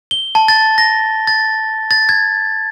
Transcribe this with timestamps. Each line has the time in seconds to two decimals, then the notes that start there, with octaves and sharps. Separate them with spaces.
0.11 G7
0.35 A5
0.48 A6
0.78 A#6
1.27 A6
1.91 A6
2.09 G#6